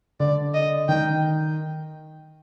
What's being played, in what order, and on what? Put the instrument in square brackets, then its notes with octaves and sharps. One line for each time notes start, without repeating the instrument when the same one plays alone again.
[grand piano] D3 [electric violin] D5
[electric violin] D#5
[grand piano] D#3 [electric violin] G5